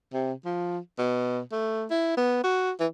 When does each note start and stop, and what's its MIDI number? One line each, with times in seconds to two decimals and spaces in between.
0.13 0.33 48
0.45 0.78 53
0.99 1.41 47
1.52 1.85 57
1.90 2.15 64
2.17 2.42 59
2.44 2.71 66
2.80 2.87 52